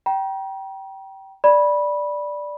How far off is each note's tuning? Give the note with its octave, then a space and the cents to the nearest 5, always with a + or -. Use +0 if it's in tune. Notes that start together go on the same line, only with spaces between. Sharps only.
G5 -20 A#5 +40
D5 +0 B5 -15